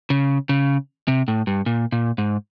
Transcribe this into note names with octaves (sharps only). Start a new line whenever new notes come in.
C#3
C#3
C3
A2
G2
A#2
A#2
G#2